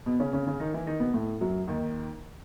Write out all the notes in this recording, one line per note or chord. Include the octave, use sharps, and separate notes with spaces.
B2 B3
C#3 C#4
C#3 C#4
C#3 C#4
D#3 D#4
E3 E4
D#3 D#4
B2 B3
A2 A3
F#2 F#3
D#2 D#3